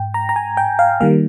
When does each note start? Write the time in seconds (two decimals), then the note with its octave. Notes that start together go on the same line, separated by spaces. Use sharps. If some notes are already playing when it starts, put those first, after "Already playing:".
Already playing: G#2 G5
0.14 A#5
0.29 A#5
0.36 G#5
0.57 G5
0.79 F5
1.00 D#3 G3 A#3 F5